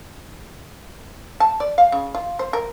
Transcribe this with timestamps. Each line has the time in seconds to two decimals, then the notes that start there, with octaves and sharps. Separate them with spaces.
1.40 A5
1.60 D5
1.78 F5
1.92 C#3
2.15 F4
2.39 C5
2.53 A#4